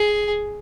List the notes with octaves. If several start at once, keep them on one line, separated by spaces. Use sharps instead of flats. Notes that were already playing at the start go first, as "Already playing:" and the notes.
Already playing: G#4